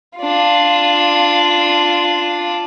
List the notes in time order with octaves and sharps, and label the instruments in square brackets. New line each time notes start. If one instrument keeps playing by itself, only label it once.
[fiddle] D4 F4